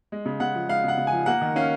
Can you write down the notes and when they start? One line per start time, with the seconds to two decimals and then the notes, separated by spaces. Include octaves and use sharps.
0.12 G#3
0.26 C#3
0.40 C#3 F#5
0.55 F3
0.69 G#3 F5
0.84 C#3 F#5
0.98 C#3
1.07 G#5
1.13 F3
1.26 A#3 F#5
1.41 D#3
1.56 C#4 F5